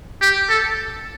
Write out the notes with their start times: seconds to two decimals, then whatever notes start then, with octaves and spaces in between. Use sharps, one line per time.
0.21 G4
0.49 A4